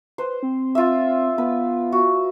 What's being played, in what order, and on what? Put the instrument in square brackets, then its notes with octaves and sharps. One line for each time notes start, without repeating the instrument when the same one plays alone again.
[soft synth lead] B4 [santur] C5
[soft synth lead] C4
[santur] F4 E5
[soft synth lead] B3 [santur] B4
[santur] F#4